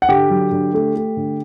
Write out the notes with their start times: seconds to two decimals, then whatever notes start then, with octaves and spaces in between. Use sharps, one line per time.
0.02 F#5
0.09 D3 G4 G5
0.30 F#3
0.52 D3
0.74 A3
0.95 A3
1.17 D3